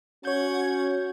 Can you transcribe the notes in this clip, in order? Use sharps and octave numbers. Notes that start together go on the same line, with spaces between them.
C#4 F#4 C#5 F#5 G6 G#6